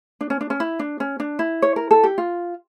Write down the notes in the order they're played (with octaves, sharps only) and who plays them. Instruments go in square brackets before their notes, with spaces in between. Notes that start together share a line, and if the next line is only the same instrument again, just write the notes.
[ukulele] D4
C#4
D4
C#4
E4
D4
C#4
D4
E4
C#5
A#4
A4
G4
F4